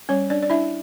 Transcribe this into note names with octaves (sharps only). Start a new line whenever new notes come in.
G3 C#4 C#5
D4 D5
D5
D4 E4 E5